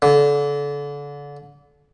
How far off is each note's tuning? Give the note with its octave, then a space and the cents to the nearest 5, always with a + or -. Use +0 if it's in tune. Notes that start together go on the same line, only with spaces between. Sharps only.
D3 -30